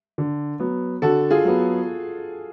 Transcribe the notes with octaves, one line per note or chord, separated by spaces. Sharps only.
D3
F#3 B3
D3 F#4 A4
F4 G#4
F#3 B3